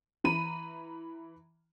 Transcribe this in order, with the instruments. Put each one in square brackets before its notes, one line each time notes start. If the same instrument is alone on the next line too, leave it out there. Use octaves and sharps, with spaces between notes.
[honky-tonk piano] E3 A#5 B5 D#7